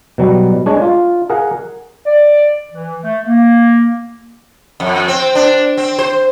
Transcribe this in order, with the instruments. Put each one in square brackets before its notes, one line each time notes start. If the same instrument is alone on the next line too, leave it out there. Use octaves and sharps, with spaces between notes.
[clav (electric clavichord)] B2 F#3 G3
G#3 D4 C#5
F4
G#4 A#4 F5 F#5
[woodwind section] D5
E3
A3
A#3
[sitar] F2
C4
D4
C4
C5